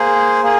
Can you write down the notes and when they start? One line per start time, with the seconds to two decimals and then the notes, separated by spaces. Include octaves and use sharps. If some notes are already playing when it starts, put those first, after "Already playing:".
Already playing: A#3 G#4 C5
0.43 A#3 G#4